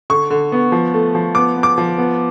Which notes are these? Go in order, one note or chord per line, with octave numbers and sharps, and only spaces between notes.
D3 C#6
D3
B3
F3
A3
F3
B3 D6
B3
D6
F3
B3